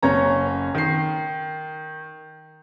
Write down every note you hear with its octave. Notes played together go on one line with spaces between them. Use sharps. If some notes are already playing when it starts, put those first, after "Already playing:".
F#1 C#4 C#5 A#5
D#3 C7